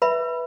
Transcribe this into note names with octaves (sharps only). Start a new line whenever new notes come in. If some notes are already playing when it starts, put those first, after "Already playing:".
B4 E5 B5